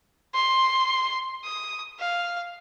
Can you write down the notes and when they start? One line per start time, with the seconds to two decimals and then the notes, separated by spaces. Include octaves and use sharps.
0.35 C6
1.44 D#6
1.99 F5